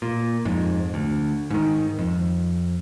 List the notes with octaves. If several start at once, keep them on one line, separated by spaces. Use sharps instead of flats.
A#2
F2 G#2
D2
G#2 D#3
F2